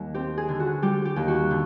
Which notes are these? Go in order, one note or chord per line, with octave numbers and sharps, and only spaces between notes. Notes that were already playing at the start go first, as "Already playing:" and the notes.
Already playing: D#2 G3
C4 G4
G#4
D3
F#4
G3 G4
G4
D#2
F#4
D3